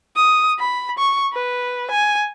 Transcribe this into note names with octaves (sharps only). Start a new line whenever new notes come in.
D#6
B5
C#6
B4
G#5